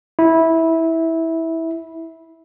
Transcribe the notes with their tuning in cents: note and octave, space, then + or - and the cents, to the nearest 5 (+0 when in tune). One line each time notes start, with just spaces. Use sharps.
E4 -15